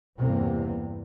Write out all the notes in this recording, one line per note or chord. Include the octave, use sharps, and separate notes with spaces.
E2 G2 C3 A#3